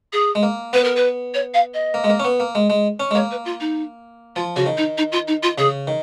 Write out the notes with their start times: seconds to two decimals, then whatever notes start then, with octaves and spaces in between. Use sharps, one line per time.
0.12 G#4
0.35 G#3
0.43 A#3
0.73 B3 B4
0.84 A#4
0.96 B4
1.34 C#5
1.54 F5
1.74 D#5
1.94 A#3
2.04 G#3
2.10 A#3
2.20 C#4
2.24 B3
2.40 A#3
2.55 G#3
2.70 G#3
3.00 C#4
3.11 G#3
3.15 A#3 C#5
3.31 B4
3.45 F4
3.60 D#4
4.36 F3 F4
4.56 C#3 F#4
4.66 D#3
4.77 D#4
4.97 D#4
5.12 F4
5.27 D#4
5.43 F4
5.58 C#3 G#4
5.87 D#3